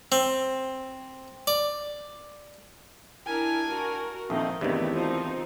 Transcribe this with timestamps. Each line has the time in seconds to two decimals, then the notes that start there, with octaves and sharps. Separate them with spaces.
0.12 C4
1.47 D5
3.26 D4 E4 A#4 G#5
3.67 F#4 A#4
4.30 A#1 D#3 A3 C4 D#4 D#5
4.61 E2 G2 C3 D#3 A3 B3 E4
4.95 F3 C4 D#4 F4